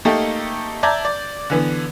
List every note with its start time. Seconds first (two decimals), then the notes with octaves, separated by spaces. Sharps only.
0.05 A3 A#3 D#4 G4 A4
0.83 D5 E5 A5 A#5 G6 G#6
1.05 D5
1.50 D3 E3 B3